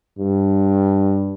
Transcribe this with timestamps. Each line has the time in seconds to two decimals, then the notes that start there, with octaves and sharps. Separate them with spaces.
0.19 G2